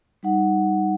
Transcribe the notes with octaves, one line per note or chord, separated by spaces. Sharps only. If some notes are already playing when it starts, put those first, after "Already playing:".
G3 D#4 F#5